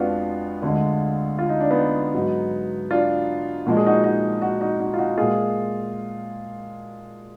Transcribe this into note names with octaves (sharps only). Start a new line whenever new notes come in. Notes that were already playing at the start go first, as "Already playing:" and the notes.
Already playing: F2 G#3 B3 D4 F4 F#4
D2 D3 G#3
F4
D#4
D4
B3 D#4
G#2 F#3
D4 F4
A#2 F3 G#3 F#4
G#4
D#4 F#4
D#4 F#4
D#4 F#4
D#4 F#4
D#4 F#4
F4
D#4 F#4
A#2 G#3 F4 G#4